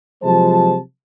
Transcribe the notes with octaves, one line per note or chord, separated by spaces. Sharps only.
C3 F3 F#3 G#3 C5 A5